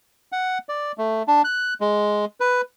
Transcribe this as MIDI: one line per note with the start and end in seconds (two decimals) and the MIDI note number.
0.32 0.58 78
0.69 0.92 74
0.98 1.23 57
1.28 1.42 62
1.44 1.74 90
1.81 2.25 56
2.40 2.61 71